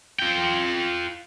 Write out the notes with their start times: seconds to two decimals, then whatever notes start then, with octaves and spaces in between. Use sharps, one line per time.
0.19 F4 G5